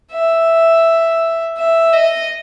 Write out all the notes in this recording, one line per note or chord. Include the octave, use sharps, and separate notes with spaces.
E5
E5
D#5